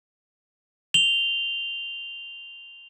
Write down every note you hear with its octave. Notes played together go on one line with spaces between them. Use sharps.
F7 G7